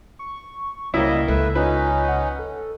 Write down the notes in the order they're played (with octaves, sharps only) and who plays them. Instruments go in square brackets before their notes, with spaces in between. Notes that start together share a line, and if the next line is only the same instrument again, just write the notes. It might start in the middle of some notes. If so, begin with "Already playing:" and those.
[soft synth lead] C#6
[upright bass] C#2 [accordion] G3 D#5 [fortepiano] A#3 E4 [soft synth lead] C#5
[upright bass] C#2 [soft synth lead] A4 [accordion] B4 E5
[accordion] C#4 D#4 [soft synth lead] F4 [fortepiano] B4
[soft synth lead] F#5
A4